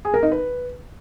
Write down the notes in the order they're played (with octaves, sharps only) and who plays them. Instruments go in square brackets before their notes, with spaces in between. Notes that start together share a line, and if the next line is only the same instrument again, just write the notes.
[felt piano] G#4
A#4
D#4
B4